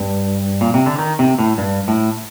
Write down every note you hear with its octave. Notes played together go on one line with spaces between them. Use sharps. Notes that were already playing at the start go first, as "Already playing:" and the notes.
Already playing: G2
A#2
C3
D3
D#3
C3
A2
G2
A2